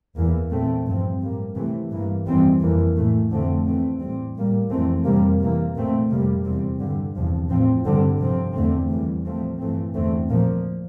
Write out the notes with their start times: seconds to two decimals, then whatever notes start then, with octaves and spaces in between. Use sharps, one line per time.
0.16 E2 E3 A#3
0.51 A#2 A3 C4
0.86 G2 F3 C4
1.21 A2 G3 A#3
1.55 C3 E3 A3 C4
1.91 G2 E3 A#3
2.26 F2 E3 G3 C4
2.61 F2 E3 A#3
2.96 A2 E3 A3
3.30 F2 D3 F3 A3 C4
3.66 E2 E3 A3 C4
4.00 A2 G3 C4
4.36 A2 G3 A#3
4.70 F2 E3 A3 C4
5.05 F2 C3 G3 A#3
5.40 C3 E3 A#3
5.75 A#2 A3 C4
6.10 F2 C3 G3 A#3
6.45 E2 C3 G3 C4
6.80 G2 D3 G3
7.15 E2 C3 F3
7.49 A2 F3 C4
7.85 G2 D3 G3 C4
8.19 C3 F3 C4
8.54 E2 D3 A3 C4
8.90 E2 E3 G3
9.24 A#2 F3 A3 C4
9.59 G2 E3 A3 C4
9.94 E2 D3 A3 C4
10.29 A#2 F3 A#3